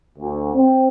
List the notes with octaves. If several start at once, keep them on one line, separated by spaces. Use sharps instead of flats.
D2
C4